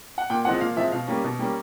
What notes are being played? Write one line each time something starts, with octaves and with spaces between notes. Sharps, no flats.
F#5
A#2 G5
F3 G#3 C4 F#5
A#2 F5
F3 G#3 C4 E5
B2 F5
G3 A#3 C#4
B2
G3 A#3 C#4